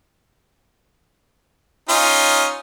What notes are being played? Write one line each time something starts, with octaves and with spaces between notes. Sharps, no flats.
C#4 D#4 F4